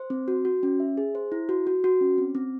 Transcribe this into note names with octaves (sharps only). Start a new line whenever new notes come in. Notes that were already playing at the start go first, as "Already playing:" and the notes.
Already playing: C5
C4
F#4
F#4
C#4
E5
G#4
C5
E4
F#4
F#4
F#4
C#4
C4
C4